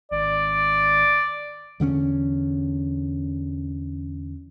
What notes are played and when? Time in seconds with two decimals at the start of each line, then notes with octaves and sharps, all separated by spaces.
0.11 G#1 D5
1.80 E2 D3 A3 C#4